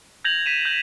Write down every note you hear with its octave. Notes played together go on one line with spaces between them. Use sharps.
G6 G#6 A#6 F7 F#7
B6 D#7 E7
G6 F#7